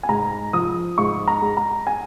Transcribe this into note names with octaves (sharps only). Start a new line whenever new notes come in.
G#5
G#2 A#5
F3 D#6
G#2 C#6
A#5
G#3
A#5
G#5